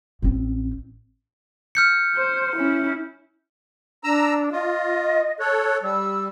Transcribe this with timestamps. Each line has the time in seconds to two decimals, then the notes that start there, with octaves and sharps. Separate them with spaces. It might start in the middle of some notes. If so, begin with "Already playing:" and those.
0.22 A1 C4
1.75 F6 G6 C#7
2.16 C5
2.56 C#4 E4
4.04 D4 A#5 E6
4.52 F4 D#5
5.40 A4 C#5 F#6
5.83 G3 E6